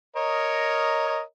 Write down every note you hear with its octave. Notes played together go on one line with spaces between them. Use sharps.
A#4 C#5 D#5